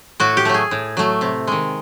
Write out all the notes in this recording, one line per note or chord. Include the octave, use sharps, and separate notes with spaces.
A2 F#4
G4
F#3 A3
G#4
A2
F#3 A3
C3
D#3 G#3